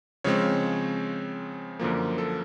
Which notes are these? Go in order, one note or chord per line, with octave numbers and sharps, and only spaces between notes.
C#3 F3 G#3 C4 C#5
F#2 D3 F3 A#3
A4